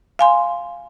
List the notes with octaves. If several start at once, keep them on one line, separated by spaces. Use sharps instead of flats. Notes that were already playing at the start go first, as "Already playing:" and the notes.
F5 G#5 C6